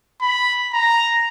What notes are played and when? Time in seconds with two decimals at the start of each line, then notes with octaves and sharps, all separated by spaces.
0.21 B5
0.73 A#5